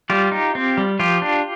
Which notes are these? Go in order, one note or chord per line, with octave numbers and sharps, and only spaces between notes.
G3 F4 G4
D#4
C4
G3
F3 F4 G4
D4